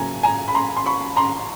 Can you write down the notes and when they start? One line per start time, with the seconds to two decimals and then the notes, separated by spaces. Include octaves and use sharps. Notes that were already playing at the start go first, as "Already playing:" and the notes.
Already playing: C#3 F#3 A#3 G#5 A#5
0.23 G#5 A#5
0.48 B5
0.55 A#5 C6
0.77 C6
0.86 B5 C#6
1.16 A#5 C6